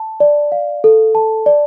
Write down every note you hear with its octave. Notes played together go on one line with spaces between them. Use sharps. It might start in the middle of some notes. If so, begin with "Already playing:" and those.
Already playing: A5
D5
F5
A4
A5
D5